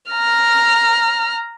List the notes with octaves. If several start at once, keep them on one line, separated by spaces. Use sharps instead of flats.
A#5 F6